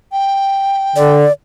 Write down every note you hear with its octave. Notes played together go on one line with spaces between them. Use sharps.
G5
D3 D5